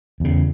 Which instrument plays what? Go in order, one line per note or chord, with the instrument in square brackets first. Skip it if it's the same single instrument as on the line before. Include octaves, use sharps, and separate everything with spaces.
[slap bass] E2 C#3